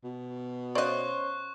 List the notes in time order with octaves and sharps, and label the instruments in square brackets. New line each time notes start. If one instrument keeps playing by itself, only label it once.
[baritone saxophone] B2
[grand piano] C#4 C5 F5 [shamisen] D5 D#5 [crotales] C#6 F#6